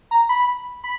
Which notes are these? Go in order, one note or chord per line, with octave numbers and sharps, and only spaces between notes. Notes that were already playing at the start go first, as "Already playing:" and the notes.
A#5
B5
B5